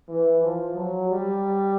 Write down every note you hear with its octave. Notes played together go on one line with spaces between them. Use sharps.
E3
F3
F#3
G3